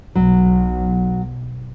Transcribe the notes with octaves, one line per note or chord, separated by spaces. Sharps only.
B1 F#3